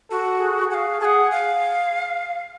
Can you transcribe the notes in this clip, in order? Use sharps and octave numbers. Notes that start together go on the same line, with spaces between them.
F#4 A4
G#4
G#4 F5 F#5
G#4 F#5 A5
F5